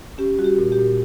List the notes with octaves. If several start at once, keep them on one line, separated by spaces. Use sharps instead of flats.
C#4 G4
G3 F#4
G4
A#2
G4
A#2